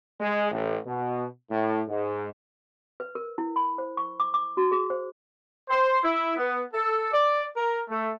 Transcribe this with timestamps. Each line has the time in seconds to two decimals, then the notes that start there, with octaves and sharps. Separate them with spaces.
0.20 G#3
0.51 A1
0.87 B2
1.51 A2
1.89 G#2
3.00 B4
3.15 A#4
3.38 E4
3.56 B5
3.78 C5
3.97 C#6
4.20 D6
4.34 D6
4.57 F#4
4.72 G#4
4.90 C5
5.69 C5
6.01 E4
6.37 B3
6.73 A4
7.12 D5
7.55 A#4
7.89 A3